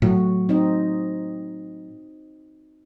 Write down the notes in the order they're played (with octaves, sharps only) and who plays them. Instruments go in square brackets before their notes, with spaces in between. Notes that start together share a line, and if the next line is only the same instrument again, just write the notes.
[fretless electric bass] A2 F#3 [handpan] F#4
[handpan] C4 D#4 D#5